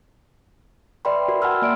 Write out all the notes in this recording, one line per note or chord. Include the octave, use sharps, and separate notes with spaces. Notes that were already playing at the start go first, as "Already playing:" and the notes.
B4 D5 E5 G5 B5 C6
F#4 A#4
F#5 G#5 A5 B5 E6 F6
A#3 D5 E5 C6 D7